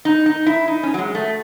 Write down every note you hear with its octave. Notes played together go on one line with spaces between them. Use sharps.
D#4
D#4
E4
D#4
C#4
F#3
G#3
A3